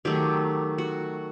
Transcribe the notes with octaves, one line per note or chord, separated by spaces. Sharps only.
D#3 F#3 A3 G4
F#4